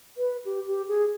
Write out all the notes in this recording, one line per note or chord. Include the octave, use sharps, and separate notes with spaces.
B4
G4
G4
G#4